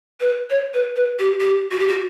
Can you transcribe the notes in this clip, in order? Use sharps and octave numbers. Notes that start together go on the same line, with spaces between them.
B4
C#5
B4
B4
G4
G4
F#4
G4
F#4